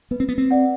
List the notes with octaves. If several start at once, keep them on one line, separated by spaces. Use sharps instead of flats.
B3 B4
C4
B3
C4
D5 F#5